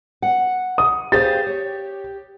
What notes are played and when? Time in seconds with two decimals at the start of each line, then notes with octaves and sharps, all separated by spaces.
0.22 F#5
0.78 D#6
1.12 G4 G#4 C5 F5 A6
1.47 C#5